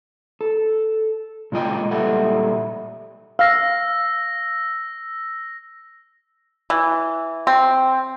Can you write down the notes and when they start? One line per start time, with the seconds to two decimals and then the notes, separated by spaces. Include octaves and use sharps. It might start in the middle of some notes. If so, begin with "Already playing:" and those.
0.41 A4
1.52 A#2 G#3 F4 D#5 G5
1.91 A#2 G3 A4 E5 F#5
3.39 F5 E6 A#6
6.70 E3
7.47 C4